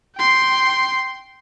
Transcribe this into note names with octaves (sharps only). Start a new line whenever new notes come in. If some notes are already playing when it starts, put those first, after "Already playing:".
G5 C6